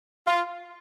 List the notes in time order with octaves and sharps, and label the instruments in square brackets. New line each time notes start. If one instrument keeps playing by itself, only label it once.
[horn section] F4